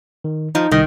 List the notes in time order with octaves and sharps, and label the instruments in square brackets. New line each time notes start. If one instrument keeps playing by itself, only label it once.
[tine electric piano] D#3
[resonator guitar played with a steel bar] F3 [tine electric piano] D#4
[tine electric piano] C2 D#5 [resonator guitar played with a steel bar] D#3